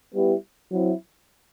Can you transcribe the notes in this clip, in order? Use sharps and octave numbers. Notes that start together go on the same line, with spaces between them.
G3 B3 E4 G4
F#3 C4 E4